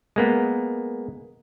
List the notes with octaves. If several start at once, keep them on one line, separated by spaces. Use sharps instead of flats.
G#3 A#3 B3